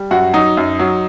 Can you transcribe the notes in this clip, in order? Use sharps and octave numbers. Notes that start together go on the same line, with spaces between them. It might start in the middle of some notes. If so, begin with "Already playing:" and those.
Already playing: G3
F#2 F#4
F#3 D#4
F#2
F#3